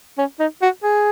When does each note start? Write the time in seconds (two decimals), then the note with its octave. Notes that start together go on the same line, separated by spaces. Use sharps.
0.18 C#4
0.40 D#4
0.62 F#4
0.83 G#4